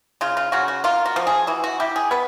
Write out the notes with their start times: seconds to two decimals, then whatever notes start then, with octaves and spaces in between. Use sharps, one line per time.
0.21 C#3 F4
0.37 F4
0.52 C#3 F#4
0.68 F#4
0.84 A#3 F4
1.05 F#4
1.16 F3
1.27 G#4
1.47 E3 F#4
1.64 F#4
1.80 E4 G4
1.96 G#4
2.11 B3 B4